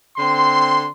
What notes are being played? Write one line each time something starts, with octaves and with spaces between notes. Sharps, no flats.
D3 C4 C6